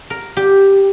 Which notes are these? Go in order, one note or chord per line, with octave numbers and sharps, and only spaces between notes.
A#4
G4